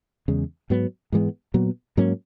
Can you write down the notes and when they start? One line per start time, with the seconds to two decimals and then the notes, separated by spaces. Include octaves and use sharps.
0.28 E2 C#3 G#3
0.70 G#2 F#3 B3
1.12 G#2 E3 G#3 B3
1.54 A#2 F#3 B3
1.97 G#2 F#3 A#3 C#4